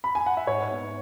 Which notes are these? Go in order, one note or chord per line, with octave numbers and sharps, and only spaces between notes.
B5
G#5
F#5
E5
G#2 C#5
B3